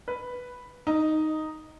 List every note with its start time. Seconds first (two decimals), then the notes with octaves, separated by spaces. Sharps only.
0.08 B4
0.87 D#4